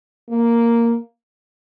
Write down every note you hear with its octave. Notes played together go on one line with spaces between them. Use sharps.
A#3